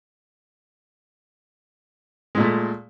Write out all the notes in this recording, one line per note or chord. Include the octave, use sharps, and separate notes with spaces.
A#2 G#3 A3